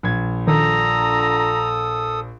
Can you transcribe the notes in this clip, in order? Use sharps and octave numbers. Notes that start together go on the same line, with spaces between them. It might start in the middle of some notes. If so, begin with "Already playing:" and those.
A#1 G#6
D3 D#3 F4 A4 A#5 D#6